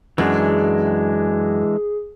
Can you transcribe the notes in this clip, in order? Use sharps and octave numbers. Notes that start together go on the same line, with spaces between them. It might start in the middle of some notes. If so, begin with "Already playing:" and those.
F#2 E3 G#3 D4 G#4